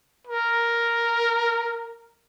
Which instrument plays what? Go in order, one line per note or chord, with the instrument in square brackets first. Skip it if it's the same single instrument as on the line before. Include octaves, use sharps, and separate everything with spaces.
[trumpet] A#4